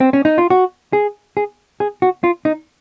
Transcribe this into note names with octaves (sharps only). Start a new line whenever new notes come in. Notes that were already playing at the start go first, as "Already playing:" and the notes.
C4
C#4
D#4
F4
F#4
G#4
G#4
G#4
F#4
F4
D#4